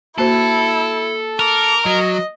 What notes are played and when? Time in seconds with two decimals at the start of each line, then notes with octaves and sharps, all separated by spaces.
0.18 A#3 E4 F#4 A4 C5
1.39 A#4 D6
1.86 F#3 D#5